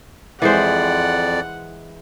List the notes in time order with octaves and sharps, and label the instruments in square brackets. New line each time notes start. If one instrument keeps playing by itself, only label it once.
[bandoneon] F2 D5 [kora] E3 G#3 C5 [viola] F#5